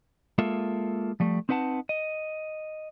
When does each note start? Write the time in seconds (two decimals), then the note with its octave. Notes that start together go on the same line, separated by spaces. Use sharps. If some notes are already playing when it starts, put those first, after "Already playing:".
0.38 G#3 A#3 F4 A4 E5
1.20 F3 G3 A3
1.49 C4 D#4 B4 F#5 A5
1.89 D#5